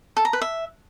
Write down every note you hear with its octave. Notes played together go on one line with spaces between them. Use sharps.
A4
A#5
B4
E5